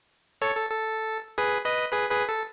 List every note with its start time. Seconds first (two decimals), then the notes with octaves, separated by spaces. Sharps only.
0.42 A4 C#5
0.56 A4
0.70 A4
1.38 G#4 B4
1.65 B4 D#5
1.92 G#4 B4
2.10 G#4 B4
2.29 A4